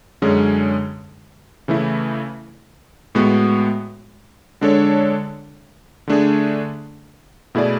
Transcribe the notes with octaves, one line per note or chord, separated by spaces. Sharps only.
F#2 D3 G#3 C#4 G#4
C#3 E3 A3 E4
A2 G#3 B3 F#4
D3 G#3 D4 A4 C#5
D3 A3 D4 G#4
B2 A3 E4 G#4 D5